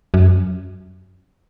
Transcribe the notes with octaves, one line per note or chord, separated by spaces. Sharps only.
F#2